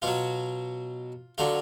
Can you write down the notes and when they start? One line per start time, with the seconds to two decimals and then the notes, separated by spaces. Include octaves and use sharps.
0.02 B2 F#3 F4
1.38 D3 F#3 F4